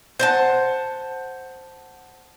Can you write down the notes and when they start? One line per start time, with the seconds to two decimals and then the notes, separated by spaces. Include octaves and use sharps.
0.19 C5 F#5 A5